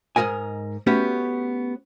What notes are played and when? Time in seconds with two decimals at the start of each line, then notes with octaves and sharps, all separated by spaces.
0.16 G#2 F3 A#4 D#5 G#5
0.87 A3 B3 C#4 F#4 G4